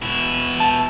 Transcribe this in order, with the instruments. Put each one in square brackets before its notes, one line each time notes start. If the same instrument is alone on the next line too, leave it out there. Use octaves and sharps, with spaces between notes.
[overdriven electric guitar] B2 E4
[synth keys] A5